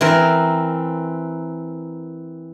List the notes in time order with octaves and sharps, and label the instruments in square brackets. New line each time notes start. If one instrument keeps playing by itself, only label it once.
[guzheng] E3 C4 A#4